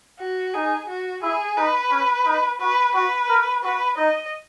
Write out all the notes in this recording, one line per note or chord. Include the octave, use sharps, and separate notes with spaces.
F#4
D#4 G#4
F#4
E4 G#4
D#4 B4
C#4
D#4
F#4 B4
F#4 B4
A#4
F#4 B4
D#4 D#5